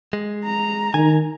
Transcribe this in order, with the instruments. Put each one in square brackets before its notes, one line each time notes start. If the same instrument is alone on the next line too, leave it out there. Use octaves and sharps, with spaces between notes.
[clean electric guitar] G#3
[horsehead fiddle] A#5
[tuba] D#3 [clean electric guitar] G#5